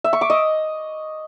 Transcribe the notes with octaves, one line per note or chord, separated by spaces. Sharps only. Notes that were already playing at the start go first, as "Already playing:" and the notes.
E5
C#6
D6
D#5